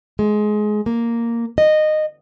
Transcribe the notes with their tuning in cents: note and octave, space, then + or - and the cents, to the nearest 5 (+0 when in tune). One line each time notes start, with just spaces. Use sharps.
G#3 +20
A#3 -5
D#5 -15